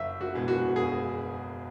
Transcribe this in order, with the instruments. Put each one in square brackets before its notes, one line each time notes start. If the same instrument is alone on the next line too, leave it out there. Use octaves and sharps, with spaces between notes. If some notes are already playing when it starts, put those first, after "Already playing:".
Already playing: [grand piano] F#1 [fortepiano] E5
[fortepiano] F#4
[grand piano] E2 B2 G#3
[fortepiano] F#4
[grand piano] F#1 [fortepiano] G#4